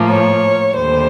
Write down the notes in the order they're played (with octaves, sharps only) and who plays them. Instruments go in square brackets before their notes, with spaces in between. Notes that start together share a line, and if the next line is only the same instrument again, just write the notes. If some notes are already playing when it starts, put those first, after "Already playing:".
Already playing: [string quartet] A2 F3 A#3
C#5
D#2 D3 G3 C5